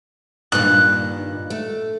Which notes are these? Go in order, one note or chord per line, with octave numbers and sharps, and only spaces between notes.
G2 A#2 D#3 F#6
A3